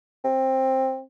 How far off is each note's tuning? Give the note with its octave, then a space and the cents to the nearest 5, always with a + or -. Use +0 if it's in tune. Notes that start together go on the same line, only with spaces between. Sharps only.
C4 +15